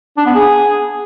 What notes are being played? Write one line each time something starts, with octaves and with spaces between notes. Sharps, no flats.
D4
B3
G#4